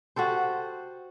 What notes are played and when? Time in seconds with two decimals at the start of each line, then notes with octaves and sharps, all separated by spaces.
0.16 F#4 G4 A4 C5